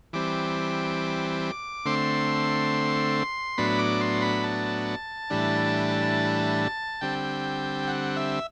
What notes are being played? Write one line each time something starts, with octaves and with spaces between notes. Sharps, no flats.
E3 G3 C4 D6
D3 A3 C4 C6
A2 F#3 B3 D4 B5
D6
C6
B5
A5
A2 E3 G3 D4
D3 G3 C4 G5
F#5
E5